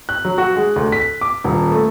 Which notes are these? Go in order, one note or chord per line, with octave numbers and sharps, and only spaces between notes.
F#6
F#3
F#4
G#3
D2
B6
D6
D#1
A3